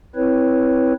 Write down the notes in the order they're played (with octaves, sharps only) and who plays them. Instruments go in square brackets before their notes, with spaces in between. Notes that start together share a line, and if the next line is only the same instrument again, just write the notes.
[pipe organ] C4 E4 B4 C#5